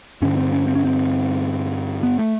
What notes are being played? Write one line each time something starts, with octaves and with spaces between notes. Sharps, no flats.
G2 D3 C#4
C4
C#4
C4
C#4
C4
B3
A3